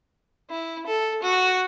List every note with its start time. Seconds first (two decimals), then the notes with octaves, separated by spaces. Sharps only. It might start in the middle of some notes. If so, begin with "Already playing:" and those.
0.50 E4
0.87 A4
1.22 F#4